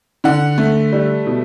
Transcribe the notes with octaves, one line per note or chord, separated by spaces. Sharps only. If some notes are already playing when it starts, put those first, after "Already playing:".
D3 F#5
A3
G3
B2